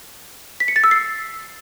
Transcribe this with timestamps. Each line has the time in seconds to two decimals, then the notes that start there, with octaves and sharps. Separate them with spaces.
0.60 B6
0.68 C#7
0.76 A6
0.84 E6
0.91 C7